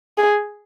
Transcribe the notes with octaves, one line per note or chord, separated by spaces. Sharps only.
G#4